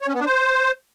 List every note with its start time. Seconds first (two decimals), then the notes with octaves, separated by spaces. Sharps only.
0.02 C#5
0.08 C#4
0.14 B3
0.20 D4
0.26 C5